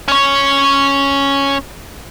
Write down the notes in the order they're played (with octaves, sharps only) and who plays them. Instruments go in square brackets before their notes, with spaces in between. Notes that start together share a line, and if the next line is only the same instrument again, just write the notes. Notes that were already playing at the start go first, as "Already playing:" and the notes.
[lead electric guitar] C#4 C#5